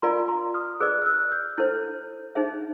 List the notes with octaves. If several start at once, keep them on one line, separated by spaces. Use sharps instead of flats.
F4 A#4 D5 F5 G#5 A#5 C6
A#5 C6
D#6 F6
G#4 B4 D5 E6 F#6
F6
E6 F#6
F6 G6
E4 A4 C5 F6 G6
D#4 G#4 C5 E5